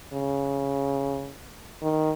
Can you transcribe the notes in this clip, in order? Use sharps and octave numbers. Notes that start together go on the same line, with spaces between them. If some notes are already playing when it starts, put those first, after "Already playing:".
C#3
D#3